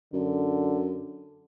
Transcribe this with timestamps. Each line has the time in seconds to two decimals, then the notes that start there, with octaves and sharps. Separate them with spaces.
0.14 F#2 D3